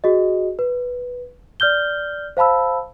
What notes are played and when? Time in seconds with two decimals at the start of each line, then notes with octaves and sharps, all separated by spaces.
0.04 F#4 G#4 D#5
0.59 B4
1.60 D5 F6 G6 G7
2.37 C5 F5 A5 B5 E6